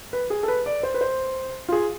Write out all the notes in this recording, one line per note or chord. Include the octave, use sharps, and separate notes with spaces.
B4
G#4
A4
B4
D5
C5
B4
C5
F4
G#4